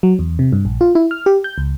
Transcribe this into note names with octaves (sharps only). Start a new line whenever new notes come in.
F#3
E2
C3
G2
A#1
F4
E4
F6
G4
G6
C#2